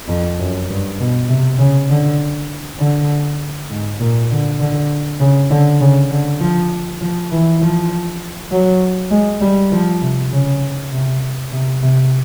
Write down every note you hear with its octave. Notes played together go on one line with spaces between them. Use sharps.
F2
F#2
G2
B2
C3
C#3
D3
D3
G#2
A#2
D3
D3
C#3
D3
C#3
D3
F3
F3
E3
F3
F#3
G#3
G3
F3
C3
C#3
C3
C3
C3